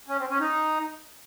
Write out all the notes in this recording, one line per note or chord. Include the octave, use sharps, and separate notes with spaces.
C#4
C4
C#4
D#4